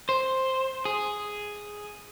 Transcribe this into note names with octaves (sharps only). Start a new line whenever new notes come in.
C5
G#4